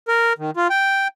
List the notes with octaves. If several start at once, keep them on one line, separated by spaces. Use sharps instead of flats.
A#4
D#3
F4
G5